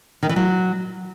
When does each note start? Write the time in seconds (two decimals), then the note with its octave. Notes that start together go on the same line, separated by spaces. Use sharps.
0.23 D#3
0.29 E3
0.36 F#3